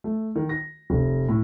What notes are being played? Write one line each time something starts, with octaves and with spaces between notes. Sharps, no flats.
A3
D#3
A#6
F1
A2